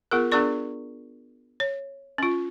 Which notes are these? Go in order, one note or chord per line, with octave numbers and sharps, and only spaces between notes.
B3 F4 G#4 A#4
B3 D4 G#4 A#4 D5 C#6
C#5
C#4 F4